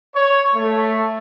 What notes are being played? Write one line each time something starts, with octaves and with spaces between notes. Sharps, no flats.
C#5
A3